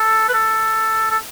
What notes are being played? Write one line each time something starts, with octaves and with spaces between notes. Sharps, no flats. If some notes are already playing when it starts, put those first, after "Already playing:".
Already playing: A4
B4
A4
A4